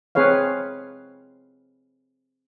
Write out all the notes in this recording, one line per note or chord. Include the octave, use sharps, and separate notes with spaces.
C4 G#4 B4 C#5 F5